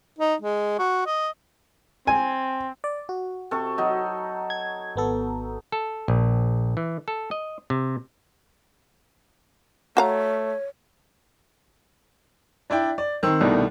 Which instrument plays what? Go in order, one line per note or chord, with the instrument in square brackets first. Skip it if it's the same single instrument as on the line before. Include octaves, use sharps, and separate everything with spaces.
[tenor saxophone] D#4
G#3
F#4
D#5
[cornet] C4 [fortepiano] G#5
[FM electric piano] D5
F#4
[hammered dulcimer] C3 A4 C#6
F#3 D#4
[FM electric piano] G#6
G#1 B3 A4
[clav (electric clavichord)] A4
A#1
E3
A4
D#5
C3
[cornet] A3 [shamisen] F#4 F5 A#5 [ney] C#5
[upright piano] D4 E4 D5 G5
D5
D#3 C4 E6
C2 B2 D#3 A3 D4